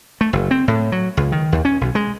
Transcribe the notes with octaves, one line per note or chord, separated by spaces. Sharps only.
A3
F#1
C4
A2
F#3
C#2
D#3
D#2
C#4
B1
G#3